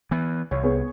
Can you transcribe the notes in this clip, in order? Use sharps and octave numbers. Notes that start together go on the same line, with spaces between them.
E3 B3
C2 C#5
B3 G#4 C#5